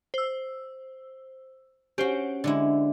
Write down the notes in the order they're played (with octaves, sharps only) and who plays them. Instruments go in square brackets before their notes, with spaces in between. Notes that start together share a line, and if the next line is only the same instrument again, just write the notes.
[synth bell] C5 E6
[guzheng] C#4 F#4 [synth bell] G4 C5
[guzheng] D3 G#3 E4